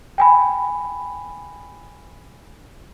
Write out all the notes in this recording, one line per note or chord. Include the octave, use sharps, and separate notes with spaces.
G5 G#5 B5